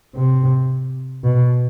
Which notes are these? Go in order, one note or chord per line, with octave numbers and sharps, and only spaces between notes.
C3
B2